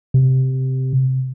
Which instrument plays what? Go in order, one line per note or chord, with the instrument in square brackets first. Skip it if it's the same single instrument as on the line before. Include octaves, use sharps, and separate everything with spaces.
[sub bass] C3